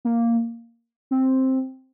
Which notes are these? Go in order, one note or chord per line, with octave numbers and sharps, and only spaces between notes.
A#3
C4